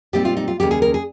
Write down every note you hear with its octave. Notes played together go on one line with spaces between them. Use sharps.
A#2 G3 C4 D#4 G4
F4
D#4
F4
D#2 C#3 G3 G4
G#4
A#4
G#4